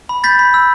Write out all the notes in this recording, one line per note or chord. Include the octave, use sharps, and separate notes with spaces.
B5
G6 A6 B6
B5
E6